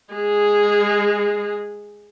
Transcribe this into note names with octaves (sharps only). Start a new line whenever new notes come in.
G#3 G#4